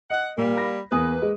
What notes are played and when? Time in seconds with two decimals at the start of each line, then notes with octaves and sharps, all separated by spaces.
0.10 D#5 F#5
0.37 A#2 G3 A#3
0.57 B5 A#6
0.92 E2 A#3 B4 D#6
1.22 G#3